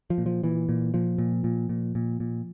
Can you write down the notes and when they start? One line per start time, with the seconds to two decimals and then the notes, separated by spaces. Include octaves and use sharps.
0.10 F3
0.18 A#2
0.26 F3
0.43 A#2 E3
0.69 A#2
0.94 A#2 F3
1.18 A#2
1.44 A#2
1.69 A#2
1.95 A#2
2.20 A#2